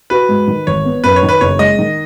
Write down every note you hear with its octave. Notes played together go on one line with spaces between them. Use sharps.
F#4 B4
G#2
D#3
G#1 C#5
B3
F#2 B4
C#5
D#3
B4
F#1 C#5
G#3 D#5
D#3